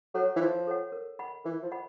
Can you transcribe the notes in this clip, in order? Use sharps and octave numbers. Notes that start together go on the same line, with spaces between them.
F#3 A4 C#5 F#5
E3
F3 F4
A4 C#5 F#5
A#4
D#5 F#5 B5
E3 A#4
F3
D#5 F#5 B5